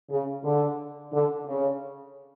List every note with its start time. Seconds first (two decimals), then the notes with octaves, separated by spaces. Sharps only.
0.10 C#3
0.44 D3
1.13 D3
1.47 C#3